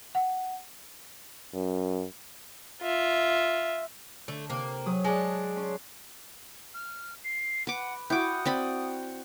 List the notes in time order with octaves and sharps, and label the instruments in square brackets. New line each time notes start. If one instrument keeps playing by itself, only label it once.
[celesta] F#5
[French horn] F#2
[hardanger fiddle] F4 E5
[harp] D3 [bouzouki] A3
[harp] C3 [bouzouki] A#3
[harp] F#3 G#4 D#6
[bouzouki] G#3 D4 [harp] F#5 A5
[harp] C#4 C6
[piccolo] F6
C7
[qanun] B4 D6 [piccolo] F#5
[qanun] E4 D6 [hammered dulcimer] F#4 F#5 G5 [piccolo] D#6
[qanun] C4 D5 B5